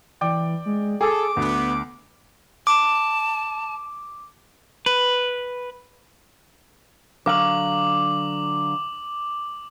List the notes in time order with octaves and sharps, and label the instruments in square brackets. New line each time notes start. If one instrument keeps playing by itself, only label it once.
[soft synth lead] E3 [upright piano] D5 G5 D6
[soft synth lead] G#3
[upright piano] G#4 [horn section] A4 [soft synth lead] D6
[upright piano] D2 [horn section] B3
[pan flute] A5 [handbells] D6
[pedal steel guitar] B4
[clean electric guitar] D3 F#3 F5 [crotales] D6 F#7